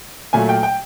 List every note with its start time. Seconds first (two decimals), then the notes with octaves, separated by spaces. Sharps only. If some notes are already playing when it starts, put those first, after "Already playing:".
0.33 A#2 F#3 A3 G#5
0.49 G5
0.63 G5